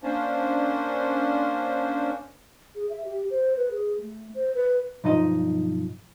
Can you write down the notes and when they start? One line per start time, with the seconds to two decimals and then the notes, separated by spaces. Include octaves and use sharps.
0.03 A#3 C#4 D4 C5
2.75 G#4
2.90 E5
3.05 G4
3.30 C5
3.57 B4
3.71 G#4
3.98 A3
4.35 C5
4.55 B4
5.04 B1 G2 F3 D#4 D#5